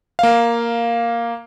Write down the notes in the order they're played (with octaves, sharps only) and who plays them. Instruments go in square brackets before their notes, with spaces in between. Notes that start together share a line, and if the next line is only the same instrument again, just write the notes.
[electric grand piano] A#3 F5